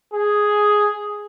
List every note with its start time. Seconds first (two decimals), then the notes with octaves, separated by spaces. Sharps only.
0.13 G#4